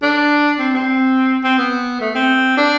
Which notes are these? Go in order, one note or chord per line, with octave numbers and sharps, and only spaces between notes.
D4
C4
C4
C4
B3
A3
C4
D4